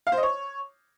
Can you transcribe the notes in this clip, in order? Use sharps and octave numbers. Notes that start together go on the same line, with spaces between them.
F5
C5
D#5
C#5